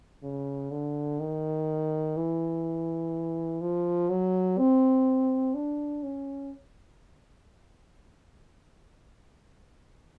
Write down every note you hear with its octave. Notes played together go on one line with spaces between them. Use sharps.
C#3
D3
D#3
E3
F3
F#3
C4
D4
C#4